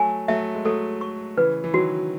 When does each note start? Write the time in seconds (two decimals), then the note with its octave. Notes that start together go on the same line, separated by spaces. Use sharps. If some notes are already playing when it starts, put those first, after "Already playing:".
Already playing: F#3 A3 G#5
0.28 F#3 A3 E5
0.54 G#3
0.65 F#3 A3 A4
1.01 C#6
1.37 C#3 E3 B4
1.64 E3
1.73 D#3 F#3 F#4